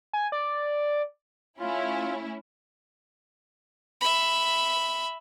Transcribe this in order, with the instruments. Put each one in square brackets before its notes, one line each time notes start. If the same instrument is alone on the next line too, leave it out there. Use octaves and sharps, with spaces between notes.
[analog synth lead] G#5
D5
[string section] A3 C#4 E4 [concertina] F4
[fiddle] E5 B5